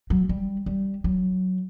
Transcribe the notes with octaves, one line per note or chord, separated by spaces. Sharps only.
F#3
G3
G3
F#3